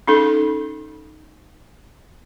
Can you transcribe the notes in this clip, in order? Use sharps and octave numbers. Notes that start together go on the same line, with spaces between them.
C#4 D#4 A4